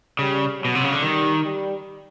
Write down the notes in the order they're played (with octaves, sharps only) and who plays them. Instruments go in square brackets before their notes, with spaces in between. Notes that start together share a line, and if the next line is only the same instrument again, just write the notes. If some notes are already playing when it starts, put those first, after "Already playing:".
[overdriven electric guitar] C#3 [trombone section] G3
[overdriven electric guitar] B2 [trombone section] F#3
[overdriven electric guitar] C3
C#3
D3
[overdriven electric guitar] D#3 [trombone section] G3
[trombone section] G3